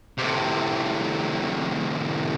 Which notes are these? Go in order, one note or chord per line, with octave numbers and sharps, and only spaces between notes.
A2 C3